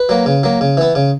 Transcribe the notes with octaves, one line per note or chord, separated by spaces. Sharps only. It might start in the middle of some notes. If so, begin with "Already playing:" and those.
Already playing: B4
F#3 A#3
C#3
F#3 A#3
C#3
E3 B3
C#3